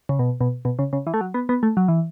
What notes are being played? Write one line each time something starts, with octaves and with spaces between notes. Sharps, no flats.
C#3
B2
B2
B2
C#3
C#3
E3
A3
F#3
B3
B3
A3
F#3
E3